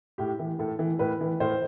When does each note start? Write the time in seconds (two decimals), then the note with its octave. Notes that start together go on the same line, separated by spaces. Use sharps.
0.18 A2 G4
0.39 E3
0.59 A2 A4
0.79 E3
0.99 A2 B4
1.21 E3
1.40 A2 C5